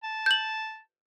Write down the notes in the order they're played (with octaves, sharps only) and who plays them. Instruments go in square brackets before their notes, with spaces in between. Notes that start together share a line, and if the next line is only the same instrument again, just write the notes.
[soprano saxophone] A5
[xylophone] G6 F#7